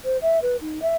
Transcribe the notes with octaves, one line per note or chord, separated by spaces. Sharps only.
C5
E5
B4
D#4
E5